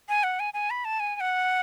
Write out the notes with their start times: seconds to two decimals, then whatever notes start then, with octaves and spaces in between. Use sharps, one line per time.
0.09 G#5
0.23 F#5
0.40 G#5
0.54 G#5
0.70 B5
0.85 A5
1.00 G#5
1.16 G#5
1.20 F#5